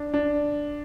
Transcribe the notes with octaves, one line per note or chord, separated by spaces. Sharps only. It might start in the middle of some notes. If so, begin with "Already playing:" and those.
Already playing: D4
D4